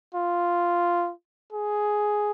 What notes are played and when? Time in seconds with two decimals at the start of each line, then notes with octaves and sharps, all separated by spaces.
0.15 F4
1.53 G#4